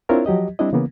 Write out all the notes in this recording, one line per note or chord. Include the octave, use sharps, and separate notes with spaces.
C4 D4 E4 F4 A#4 C#5
F3 F#3 G4 D#5
G3 C4 D4 E4 D#5
C#3 E3 A#3 B3